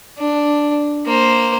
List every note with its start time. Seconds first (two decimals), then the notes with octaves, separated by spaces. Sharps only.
0.17 D4
1.06 A#3 C5